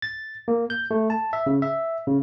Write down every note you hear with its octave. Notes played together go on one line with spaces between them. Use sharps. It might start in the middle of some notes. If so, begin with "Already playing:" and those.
A6
A#3
G6
A3
A5
E5
C#3
E5
C#3